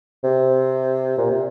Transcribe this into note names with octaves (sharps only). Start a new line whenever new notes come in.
C3
A#2
C3